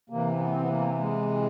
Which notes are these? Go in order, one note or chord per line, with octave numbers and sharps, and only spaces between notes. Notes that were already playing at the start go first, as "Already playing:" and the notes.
C3 E3 A#3
B3
C4
B3
A#3
G#3